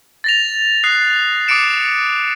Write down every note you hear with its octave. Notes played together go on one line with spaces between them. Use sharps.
A6 A#6 F7
D#6 F#6 C7
D6 D#6 A6 C#7 D7 E7